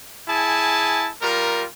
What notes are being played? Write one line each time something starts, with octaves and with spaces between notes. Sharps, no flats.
E4 G#4 G#5 A5
G3 F4 A#4